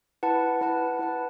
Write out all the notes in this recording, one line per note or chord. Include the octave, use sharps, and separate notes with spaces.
E4 B4 F#5 A5
E4 B4 F#5 A5
E4 B4 F#5 A5